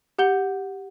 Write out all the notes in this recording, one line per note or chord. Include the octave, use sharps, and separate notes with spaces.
G4 F#5 G6 G7